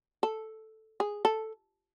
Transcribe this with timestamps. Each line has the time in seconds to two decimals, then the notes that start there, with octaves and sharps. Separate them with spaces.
0.23 A4
1.00 G#4
1.25 A4